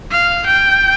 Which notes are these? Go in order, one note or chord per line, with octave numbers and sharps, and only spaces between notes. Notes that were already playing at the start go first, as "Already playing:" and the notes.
F5
G5